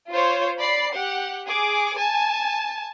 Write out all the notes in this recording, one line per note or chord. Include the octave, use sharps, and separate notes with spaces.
F4 C5 C#5
D5 B5 C7
G4 F#5
G#4 D6
G#5 A5